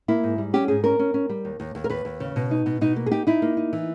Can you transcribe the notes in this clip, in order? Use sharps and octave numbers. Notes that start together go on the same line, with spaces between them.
A#3 E4
G#2
G3
C#4 G4
G#2 G#4
C#4 A#4
C#4
C#4
G3
D#2
D#2
D#2
A#4
D#2 B4
D#2
C#3
B2
D#4
B2
B2 D#4
A#3
G#4
D#4 G4
D#4 E4
A#3
D#4
E3